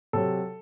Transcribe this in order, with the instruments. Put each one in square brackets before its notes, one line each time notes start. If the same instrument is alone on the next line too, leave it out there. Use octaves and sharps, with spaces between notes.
[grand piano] C3 F#3 A4